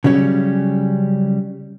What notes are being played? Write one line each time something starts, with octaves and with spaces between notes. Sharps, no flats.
C#3 F#3 G3 C#4